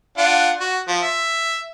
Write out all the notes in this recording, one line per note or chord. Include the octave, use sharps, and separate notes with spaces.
D4 F4 F#5
F#4
F3
E5